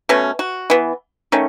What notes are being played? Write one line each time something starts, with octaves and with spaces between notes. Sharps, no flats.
B2 A3 C#4
F#4
E3 B3
D#3 A3 C#4